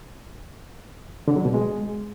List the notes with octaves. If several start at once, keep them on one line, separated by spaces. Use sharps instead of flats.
D3
F#3
B2
G#3